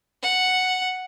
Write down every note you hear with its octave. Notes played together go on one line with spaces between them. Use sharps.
F#5